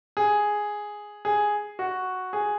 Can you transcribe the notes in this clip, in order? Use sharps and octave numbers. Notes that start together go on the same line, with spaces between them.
G#4
G#4
F#4
G#4